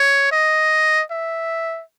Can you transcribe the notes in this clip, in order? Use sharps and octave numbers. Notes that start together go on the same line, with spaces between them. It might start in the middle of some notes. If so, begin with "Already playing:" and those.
Already playing: C#5
D#5
E5